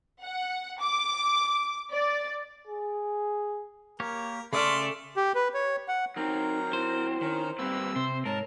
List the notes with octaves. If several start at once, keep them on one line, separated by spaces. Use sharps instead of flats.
F#5
D6
D5
G#4
A#3 G4 A#4 C#5
C#3 A3 D5 E5 C6 F6
G4
B4
C#5
F#5
F#3 C4 D#4 A#4
E4 C5
D#3 C#4 A#4
G3 A#3 C4 B4 E6
C3 C5
G#2 A#4 C#5 A5